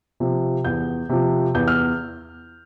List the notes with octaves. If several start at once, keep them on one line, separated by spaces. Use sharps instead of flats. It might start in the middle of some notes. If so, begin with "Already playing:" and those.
C3 F3
E2 G6
C3 F3
E2 G6
F6